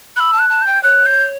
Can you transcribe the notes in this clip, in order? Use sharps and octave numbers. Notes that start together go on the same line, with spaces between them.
B5 E6 F#6
A5
F#6
A5
G6
G5
C#5 F#6
G6